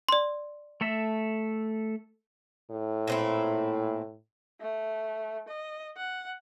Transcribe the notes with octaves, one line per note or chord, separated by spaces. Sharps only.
D5 C6
A3 A4 E5
A2
A#2 C4 E4
A3
D#5
F#5